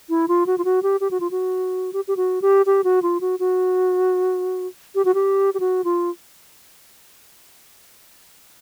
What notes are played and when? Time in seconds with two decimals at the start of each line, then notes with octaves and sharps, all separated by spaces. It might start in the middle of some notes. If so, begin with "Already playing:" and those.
0.10 E4
0.28 F4
0.46 F#4
0.58 F4
0.65 F#4
0.83 G4
1.01 G4
1.11 F#4
1.20 F4
1.31 F#4
1.93 G4
2.08 G4
2.17 F#4
2.42 G4
2.66 G4
2.84 F#4
3.02 F4
3.21 F#4
3.39 F#4
4.95 G4
5.05 F#4
5.14 G4
5.54 G4
5.60 F#4
5.84 F4